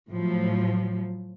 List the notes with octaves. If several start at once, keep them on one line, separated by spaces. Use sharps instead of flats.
A2 F3 F#3